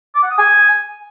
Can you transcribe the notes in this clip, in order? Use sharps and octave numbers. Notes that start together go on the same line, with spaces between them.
D6
F#5
D#6
G#5